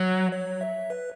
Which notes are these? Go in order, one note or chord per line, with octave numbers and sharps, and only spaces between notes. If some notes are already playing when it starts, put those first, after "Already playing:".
Already playing: F#3 C#5
C#5
E5
B4